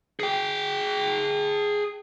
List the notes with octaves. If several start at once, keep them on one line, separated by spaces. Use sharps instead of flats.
G#4 G5